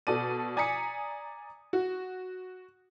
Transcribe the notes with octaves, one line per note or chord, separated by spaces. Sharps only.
B2 A4 D5 D#7
D5 G#5 A#5 D#6 B6 C#7
F#4